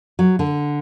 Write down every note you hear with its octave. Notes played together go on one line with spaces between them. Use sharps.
F#3
D3